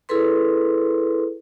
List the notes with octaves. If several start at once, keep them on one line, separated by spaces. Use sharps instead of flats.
E4 G#4 A4 B4 C6